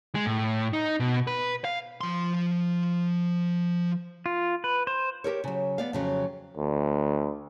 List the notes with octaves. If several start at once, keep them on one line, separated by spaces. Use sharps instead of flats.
G#3
A2
D#4
B2
B4
F5
F3 C6
F4
B4
C5
G4 A4 A#4 C#5
C#3 F#3
B3 D5 F5
F2 C#3 F#3
D2